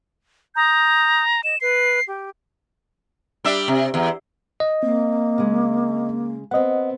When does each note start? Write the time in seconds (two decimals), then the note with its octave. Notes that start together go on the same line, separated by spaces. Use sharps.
0.56 A#5 D#6 G6
1.44 D#5 E7
1.61 B4 C7
2.07 G4
3.45 G3 D4 E5
3.68 C3
3.94 E2
4.60 D#5
4.83 A#3 C4
5.38 C#3 G#3
6.51 B3 C4 D#5 F#5